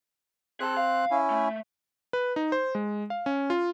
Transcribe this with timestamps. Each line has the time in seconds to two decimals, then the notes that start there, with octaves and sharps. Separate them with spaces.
0.60 C4 G#4 A5 F#6
0.77 F5
1.11 C#4 E4
1.30 A3
2.13 B4
2.36 D#4
2.52 C5
2.75 G#3
3.10 F5
3.26 C#4
3.50 F4